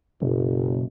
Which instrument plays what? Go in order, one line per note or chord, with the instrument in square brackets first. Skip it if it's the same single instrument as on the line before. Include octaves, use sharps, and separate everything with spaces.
[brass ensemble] F#1 [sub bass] B2